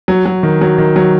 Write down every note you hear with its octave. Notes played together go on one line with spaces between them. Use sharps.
F#3
F#3
D#3
F#3
D#3
F#3